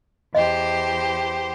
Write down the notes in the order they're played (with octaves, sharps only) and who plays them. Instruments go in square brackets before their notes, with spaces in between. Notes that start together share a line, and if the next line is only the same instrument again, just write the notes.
[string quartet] E2 G4 C5 [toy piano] D#5